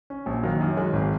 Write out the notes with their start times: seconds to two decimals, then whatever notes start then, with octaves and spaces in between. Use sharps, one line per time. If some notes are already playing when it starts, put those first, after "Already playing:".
0.10 C#4
0.26 A#1
0.43 D#3 F#3 A#3
0.60 F#2
0.77 D#3 F#3 G#3
0.93 G#1